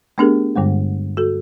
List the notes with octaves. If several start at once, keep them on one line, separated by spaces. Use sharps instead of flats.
A3 B3 D4 G4 G#4 A#4
G2 D3 G3 G#3
F#4 A4